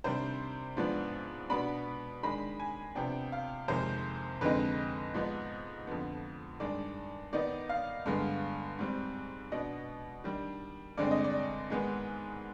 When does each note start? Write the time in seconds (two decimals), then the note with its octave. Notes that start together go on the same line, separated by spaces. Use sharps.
0.04 C3 D#3 G3 D4 C5
0.77 G#2 F3 B3 D4
1.50 B2 B3 D4 B5
2.23 D#3 G#3 D4 B5
2.60 G#5
2.95 C3 F3 B3 D4 G5
3.32 F5
3.68 F2 C3 D#3 G#3 C5
4.41 F2 D3 G#3 C4 D#4 B4
5.14 G#2 F3 B3 D#4
5.87 F2 D3 F3 B3
6.60 G2 D#3 G#3 D4 D5
7.33 D#3 B3 D#4 D5
7.69 F5
8.06 G2 D3 G#3 B3
8.79 G#2 G3 C4
9.52 B2 B3 D4 D#5
10.24 D#3 G3 D4
10.97 G2 D3 G#3 C4 D5
11.11 D#5
11.24 D5
11.70 G#2 D#3 G#3 B3